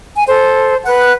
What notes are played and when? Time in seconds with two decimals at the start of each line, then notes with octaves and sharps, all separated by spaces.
0.15 G#5
0.27 A4 C5
0.85 B4 F#5 F#6